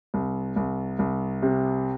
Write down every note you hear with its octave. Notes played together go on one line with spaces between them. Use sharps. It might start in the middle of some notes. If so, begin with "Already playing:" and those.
C2
C2
C2
C3